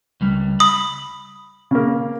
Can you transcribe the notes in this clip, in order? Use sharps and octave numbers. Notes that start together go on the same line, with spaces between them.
C#2 G3
B5 D#6
C#3 A#3